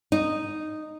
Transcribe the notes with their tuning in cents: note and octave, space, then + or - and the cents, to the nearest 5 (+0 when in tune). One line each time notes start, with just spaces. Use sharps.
D#4 -10